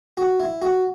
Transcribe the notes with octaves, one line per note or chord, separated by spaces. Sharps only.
F#4
E4
F#4